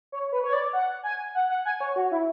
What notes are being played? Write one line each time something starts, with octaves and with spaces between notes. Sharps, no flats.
C#5
B4
C#5
D5
F#5
G#5
F#5
F#5
G#5
C#5
F#4
E4